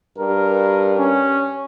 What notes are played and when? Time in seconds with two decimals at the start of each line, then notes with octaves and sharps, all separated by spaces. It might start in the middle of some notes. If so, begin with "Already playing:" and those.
0.18 G2 A#4
0.98 C#4